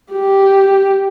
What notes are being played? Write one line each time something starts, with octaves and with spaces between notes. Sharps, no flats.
G4